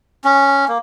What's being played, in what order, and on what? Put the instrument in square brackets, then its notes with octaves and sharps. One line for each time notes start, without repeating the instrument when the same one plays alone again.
[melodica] C#4
A#3